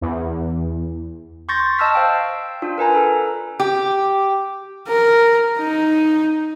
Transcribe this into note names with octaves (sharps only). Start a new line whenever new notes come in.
E2
C6 C#6 G6 A6 A#6
D#5 A5 E6 F6 B6
C5 F5 G5
D4 F4
A#4 B4 G#5 A#5
A4
G4
A#4
D#4